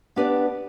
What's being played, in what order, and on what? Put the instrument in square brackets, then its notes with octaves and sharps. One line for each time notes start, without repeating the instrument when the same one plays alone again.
[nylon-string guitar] B3 D4 G4 B4 D5